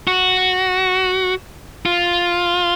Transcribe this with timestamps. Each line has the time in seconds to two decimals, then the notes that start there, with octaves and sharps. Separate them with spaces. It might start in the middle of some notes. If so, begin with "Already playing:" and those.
0.08 F#4
1.86 F4